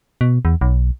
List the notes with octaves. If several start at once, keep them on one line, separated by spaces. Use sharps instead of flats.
B2
E2
B1